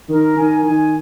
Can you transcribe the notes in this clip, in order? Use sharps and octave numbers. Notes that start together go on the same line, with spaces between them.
D#3 A#4
D#3 G#5
D#3 G#5